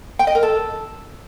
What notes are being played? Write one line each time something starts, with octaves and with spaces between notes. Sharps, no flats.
G5
D#5
A#4
A4